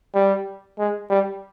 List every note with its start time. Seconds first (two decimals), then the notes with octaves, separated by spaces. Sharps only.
0.15 G3
0.79 G#3
1.10 G3